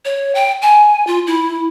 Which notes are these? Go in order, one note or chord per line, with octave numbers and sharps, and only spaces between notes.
C#5
G5
G#5
F4
E4